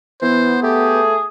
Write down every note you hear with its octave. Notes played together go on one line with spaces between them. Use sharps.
E3 B3 C5
A3 G4 G#4